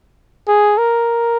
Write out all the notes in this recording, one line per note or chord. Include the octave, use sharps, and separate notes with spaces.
G#4
A#4